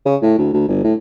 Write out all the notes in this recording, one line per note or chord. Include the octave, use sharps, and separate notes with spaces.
C#3
A2
D2
D2
G1
A2